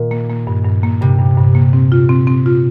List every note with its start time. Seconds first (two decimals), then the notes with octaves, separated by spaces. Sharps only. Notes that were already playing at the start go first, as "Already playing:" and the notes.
Already playing: A#2 D#3
0.11 A#3
0.30 A#3
0.47 G2
0.65 G2
0.83 A#3
1.01 G2 C3
1.19 G2
1.37 G2
1.55 A#3
1.73 C4
1.92 F4
2.09 C4
2.27 C4
2.46 F4